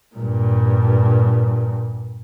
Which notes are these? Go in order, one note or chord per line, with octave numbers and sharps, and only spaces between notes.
G2 A#2